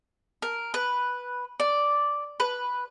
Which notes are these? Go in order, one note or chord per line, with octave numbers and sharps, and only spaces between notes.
A#4
B4
D5
B4